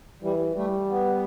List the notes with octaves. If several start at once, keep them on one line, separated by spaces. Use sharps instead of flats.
E3 G3
G3 A3
B3